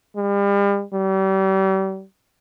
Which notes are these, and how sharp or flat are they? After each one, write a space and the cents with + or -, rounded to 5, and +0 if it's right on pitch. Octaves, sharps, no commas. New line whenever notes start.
G3 +40
G3 -35